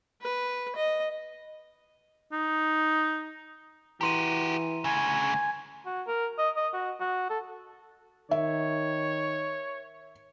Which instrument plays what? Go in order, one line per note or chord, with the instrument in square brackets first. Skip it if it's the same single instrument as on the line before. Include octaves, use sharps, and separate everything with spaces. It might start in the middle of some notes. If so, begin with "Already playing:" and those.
[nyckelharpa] B4
D#5
[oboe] D#4
[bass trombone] E3 [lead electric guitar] F#4 G4 [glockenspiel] A#5 C6 D#7
[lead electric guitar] D2 C#3 [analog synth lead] G#5
[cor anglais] F#4
A#4
D#5
D#5
F#4
F#4
A4
[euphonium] D#3 [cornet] C#5 [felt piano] E5